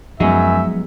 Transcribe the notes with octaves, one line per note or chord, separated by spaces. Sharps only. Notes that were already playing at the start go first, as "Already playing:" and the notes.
F#2 F3 F#3 G#3 B3 D#4 F#4 E5